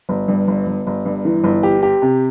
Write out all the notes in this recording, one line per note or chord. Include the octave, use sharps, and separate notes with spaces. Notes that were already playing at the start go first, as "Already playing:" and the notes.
G1
G2
G1
G1
G1
G2
E3
G1
G4
G4
C3